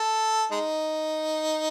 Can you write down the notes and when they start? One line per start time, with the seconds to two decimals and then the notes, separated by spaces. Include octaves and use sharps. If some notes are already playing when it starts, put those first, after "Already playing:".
Already playing: A4
0.51 G#3 D#4